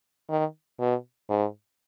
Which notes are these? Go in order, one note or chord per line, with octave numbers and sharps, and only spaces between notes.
D#3
B2
G#2